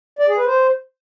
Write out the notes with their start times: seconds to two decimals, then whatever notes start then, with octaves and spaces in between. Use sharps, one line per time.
0.19 D5
0.28 G#4
0.37 B4
0.46 C5